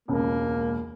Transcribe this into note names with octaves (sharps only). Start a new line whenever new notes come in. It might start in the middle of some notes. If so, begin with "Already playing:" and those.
E1 C#2 A#3